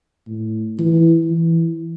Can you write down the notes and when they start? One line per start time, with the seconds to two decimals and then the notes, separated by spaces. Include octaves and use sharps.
0.27 A2
0.79 E3
1.31 E3